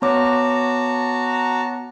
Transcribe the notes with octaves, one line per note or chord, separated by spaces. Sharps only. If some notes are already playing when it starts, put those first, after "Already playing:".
B3 F#4 C#5 A5 A#5 D6